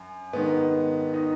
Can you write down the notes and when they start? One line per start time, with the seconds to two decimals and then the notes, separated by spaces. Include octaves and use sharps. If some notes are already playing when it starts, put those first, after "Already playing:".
Already playing: F#2
0.33 G#2 D#3 B3
1.14 D#4